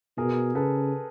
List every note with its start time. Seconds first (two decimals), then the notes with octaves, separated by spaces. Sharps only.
0.18 B2 G#4 A#4
0.55 C#3 A4 B4